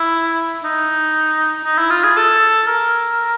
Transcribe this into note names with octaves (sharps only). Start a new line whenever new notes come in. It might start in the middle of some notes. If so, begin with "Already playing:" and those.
Already playing: E4
D#4
D#4
E4
F4
G#4
A4
A#4